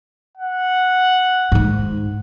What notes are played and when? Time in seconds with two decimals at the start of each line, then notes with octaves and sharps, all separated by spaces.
0.37 F#5
1.52 G#2 D#3